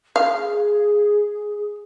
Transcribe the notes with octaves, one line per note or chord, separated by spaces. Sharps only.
G#4 F5